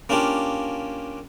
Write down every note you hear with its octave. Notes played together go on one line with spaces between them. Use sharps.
A#3 C#4 D4 F4 G4